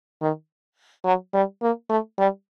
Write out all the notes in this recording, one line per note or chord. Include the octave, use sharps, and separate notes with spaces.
D#3
F#3
G3
A#3
A3
G3